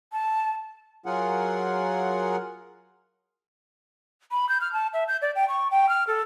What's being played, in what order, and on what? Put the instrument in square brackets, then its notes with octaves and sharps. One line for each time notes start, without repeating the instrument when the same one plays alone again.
[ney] A5
[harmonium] F#3 F4 G#4 A#4 F#5 G#5
[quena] B5
G6
F6
A5
E5
G6
D5
G5
C#6
G5
F6
A4